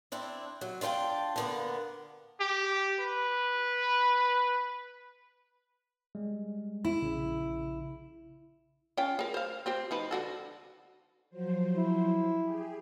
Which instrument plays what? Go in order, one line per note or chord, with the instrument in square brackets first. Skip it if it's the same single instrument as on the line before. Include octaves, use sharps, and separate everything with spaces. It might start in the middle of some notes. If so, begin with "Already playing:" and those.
[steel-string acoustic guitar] C4 D4 E4
F#3
D4 F4 A#4 G5 A5
D3 A#3 B3
[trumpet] G4
B4
[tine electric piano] G3 G#3
[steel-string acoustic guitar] E4
[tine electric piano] A#1 C#3
[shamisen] C#4 F4 G5
G#4 A#4
C5 F5
C4 G4 C5
F3 D#4 B4
D3 F#4 A4
[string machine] F3 F#3 C5
[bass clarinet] E4
[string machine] G4 G#4